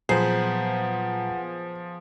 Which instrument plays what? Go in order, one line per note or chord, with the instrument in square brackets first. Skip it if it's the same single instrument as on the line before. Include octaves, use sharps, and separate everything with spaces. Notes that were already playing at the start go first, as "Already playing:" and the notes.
[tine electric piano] A#2 F#3 A#5 [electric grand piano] F3 G#4 [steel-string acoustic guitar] B3 [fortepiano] C5